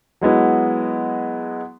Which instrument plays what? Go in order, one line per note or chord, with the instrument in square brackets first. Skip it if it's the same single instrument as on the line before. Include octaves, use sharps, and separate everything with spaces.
[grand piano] F#3 G#3 B3 E4